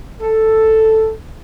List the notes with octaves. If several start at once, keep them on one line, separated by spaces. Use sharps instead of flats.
A4